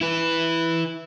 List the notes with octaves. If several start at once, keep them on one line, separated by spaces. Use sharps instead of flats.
E4 B4